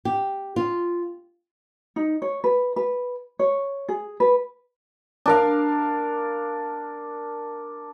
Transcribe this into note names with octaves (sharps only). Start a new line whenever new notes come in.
G4
F4
D#4
C#5
B4
B4
C#5
G#4
B4
D4 A#4 F5